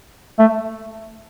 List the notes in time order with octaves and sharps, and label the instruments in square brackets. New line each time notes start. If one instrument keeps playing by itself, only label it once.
[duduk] A3